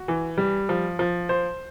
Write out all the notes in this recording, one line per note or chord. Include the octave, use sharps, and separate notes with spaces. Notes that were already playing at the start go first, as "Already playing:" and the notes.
Already playing: F#4
E3
G3
F3
F3
C5